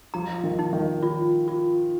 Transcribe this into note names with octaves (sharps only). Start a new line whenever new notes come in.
F3 A#5
D#3
D#4
D#3
F4
F4